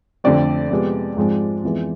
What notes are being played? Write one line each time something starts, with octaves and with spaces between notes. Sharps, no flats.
F2 D3 A3 C4 D5
F2 C3 G#3 B3
G#2 F3 G#3 C4
F2 E3 G#3 B3